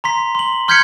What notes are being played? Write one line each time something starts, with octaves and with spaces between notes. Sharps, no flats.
A#5 C6 B6
C6 F#7
C6 F6 G6 G#6 B6 C#7